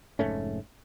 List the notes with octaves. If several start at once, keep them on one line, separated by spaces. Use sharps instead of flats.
F1 G#2 A3 C#4